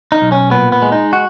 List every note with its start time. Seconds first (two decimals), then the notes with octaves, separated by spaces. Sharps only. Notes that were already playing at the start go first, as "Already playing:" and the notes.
0.12 D#4
0.22 B1
0.32 C#4
0.51 A#2 B3
0.72 B3
0.82 G#3
0.92 D#4
1.13 F#4